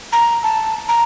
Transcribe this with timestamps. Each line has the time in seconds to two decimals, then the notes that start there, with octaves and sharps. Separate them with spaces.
0.12 A#5
0.43 A5
0.88 A#5